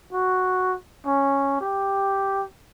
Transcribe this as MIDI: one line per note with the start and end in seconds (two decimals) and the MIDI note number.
0.13 0.76 66
1.06 1.60 61
1.61 2.44 67